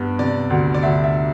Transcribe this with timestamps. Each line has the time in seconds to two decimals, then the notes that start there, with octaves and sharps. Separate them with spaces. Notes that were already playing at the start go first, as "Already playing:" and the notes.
Already playing: G2 B3
0.19 C3 D5
0.50 D2
0.74 D5
0.83 D2 E5
1.04 E5